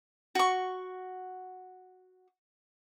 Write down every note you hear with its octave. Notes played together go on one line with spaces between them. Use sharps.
F#4 C#6